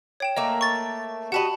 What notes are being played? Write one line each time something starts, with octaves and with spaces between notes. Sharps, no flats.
C#5 G5 E7
A3 A#3 D#5 A#5
C#6 A6
F#4 G4 D#5 F#5 A5 B5